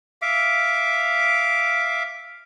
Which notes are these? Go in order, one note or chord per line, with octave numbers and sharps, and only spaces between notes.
E5 F5 D6